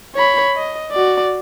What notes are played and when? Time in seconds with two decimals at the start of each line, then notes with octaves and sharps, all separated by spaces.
0.15 C#5 B5
0.56 D#5
0.92 F#4 D5